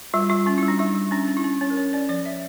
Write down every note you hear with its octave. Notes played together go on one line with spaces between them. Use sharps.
G3 F4
G3 F4
C#4 F4
G3 E4
D4
G3 E4
G3
C#4 D4
C#4
E4
C#4
C#4 C#5
A#4
C#4 C#5
C#4 D5
F3 D5
F3 E5